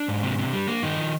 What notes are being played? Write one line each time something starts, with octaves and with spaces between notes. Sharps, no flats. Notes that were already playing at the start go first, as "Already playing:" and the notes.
Already playing: D4
G#2
C3
C3
G3
A#3
G2 D#3 D#4
F3